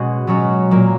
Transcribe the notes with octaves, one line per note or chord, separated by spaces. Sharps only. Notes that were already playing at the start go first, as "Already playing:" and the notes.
Already playing: B2 G#3 B3 C#4 F#4
B2 F#3 C#4 F#4
A#2 F#3 A#3